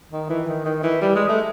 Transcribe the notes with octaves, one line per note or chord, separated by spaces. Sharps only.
D#3
E3
D#3
D#3
E3
G3
G#3
A3